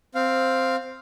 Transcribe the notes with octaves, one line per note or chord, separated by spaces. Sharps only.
C4 F5